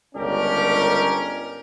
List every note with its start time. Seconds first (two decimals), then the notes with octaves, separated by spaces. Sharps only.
0.15 G1 C#2 C#4 D4 G4 A#4